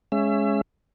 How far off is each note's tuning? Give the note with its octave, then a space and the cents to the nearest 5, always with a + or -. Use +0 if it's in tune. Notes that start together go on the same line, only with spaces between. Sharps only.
G#3 +0 C#4 +0 E5 +30